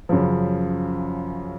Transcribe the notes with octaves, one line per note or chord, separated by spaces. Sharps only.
F#2 C#3 F3